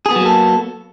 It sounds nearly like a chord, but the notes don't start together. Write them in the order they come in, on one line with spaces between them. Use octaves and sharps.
G#4 B3 F#3 A#3 A4